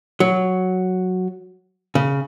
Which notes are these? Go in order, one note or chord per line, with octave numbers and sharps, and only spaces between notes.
F#3
C#3